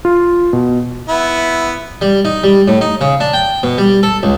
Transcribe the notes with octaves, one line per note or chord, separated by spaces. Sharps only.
F4
B2
B3 E4
G3
D#4
G3
A2
D#4
C#3
D4
G5
B2
G3
A4
C#2